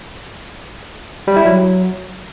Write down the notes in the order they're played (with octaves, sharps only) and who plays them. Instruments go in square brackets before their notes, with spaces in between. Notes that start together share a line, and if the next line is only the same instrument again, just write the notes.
[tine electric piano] G3
E4
F#3